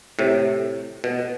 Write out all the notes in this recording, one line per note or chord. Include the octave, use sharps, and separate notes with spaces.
A2 C3
B2